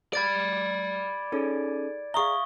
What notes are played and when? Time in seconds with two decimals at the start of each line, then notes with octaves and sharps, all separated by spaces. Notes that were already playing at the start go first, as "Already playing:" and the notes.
0.13 D5 B5 G#6 A6 D7
1.32 C#4 D#4 G#4 A4
2.14 G#4 E5 F5 A#5 C#6 D#6 G7